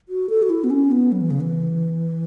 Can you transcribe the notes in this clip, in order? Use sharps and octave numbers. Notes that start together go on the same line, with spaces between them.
F#4
A4
F#4
E4
B3
C#4
B3
F#3
E3
C#3
E3